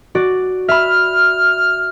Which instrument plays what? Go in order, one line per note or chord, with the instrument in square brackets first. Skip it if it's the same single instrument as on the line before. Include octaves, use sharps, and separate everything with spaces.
[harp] F#4 D5
[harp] E5 B5 [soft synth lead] F6